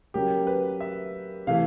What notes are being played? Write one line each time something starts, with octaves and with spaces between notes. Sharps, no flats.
C#3 F#3 A#3 G4
B4
E5
C3 E3 A3 F5